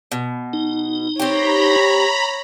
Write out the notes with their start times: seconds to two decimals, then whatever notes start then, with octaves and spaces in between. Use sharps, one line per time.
0.12 B2
0.53 D#4
1.20 C4 G4 C#5 A#5 B5